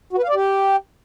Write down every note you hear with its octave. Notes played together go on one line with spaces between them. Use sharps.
F#4
B4
F5
D5
G4